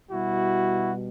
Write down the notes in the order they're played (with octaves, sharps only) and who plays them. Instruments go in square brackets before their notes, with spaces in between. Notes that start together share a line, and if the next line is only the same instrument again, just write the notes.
[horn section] B2 G3 E4 F#4